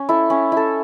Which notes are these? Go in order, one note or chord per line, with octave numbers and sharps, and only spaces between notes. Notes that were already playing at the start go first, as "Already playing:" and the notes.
Already playing: C#4
E4 A4
C#4
E4 A4